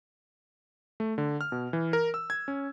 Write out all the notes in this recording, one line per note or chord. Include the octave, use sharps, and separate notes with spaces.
A3
D3
F6
B2
E3
A#4
E6
G#6
C#4